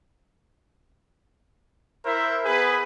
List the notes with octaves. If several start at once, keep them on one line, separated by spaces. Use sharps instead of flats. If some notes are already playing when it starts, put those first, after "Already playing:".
E4 A#4 C5 E5
B3 G#4 B4